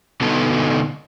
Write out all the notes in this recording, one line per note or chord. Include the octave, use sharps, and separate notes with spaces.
B2 D3 B3 D#4 A4 A5